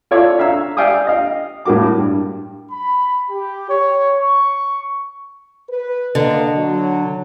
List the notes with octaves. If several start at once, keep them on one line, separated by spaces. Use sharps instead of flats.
F4 A4 C#5 D5 E5 F5
E5 F5 A#5 E6
D5 E5 F5 G5 G#5 D#6
D#5 F5
A2 G3 A#3 F#4 D6
G2
B5
G4
C#5
C#6
B4
D3 A#3 D#5
F#3